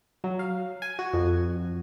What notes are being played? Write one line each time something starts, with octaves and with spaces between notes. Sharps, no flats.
F#3
F5
G#5
F#4
F2